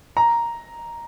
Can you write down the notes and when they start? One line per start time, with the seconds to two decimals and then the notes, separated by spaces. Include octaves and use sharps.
0.17 A#5